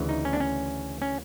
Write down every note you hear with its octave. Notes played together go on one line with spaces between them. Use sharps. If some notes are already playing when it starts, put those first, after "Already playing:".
Already playing: D2 C#3 E3
D#4
C#4
D4
C#4
C#4